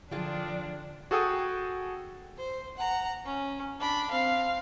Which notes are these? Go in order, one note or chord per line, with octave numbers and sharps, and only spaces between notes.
D3 F3 D4 F4 G#4 G5
F#4 G#4 A4 F#5 G5 D#6
C5
F#5 A#5
C#4
D4 B5
C4 F5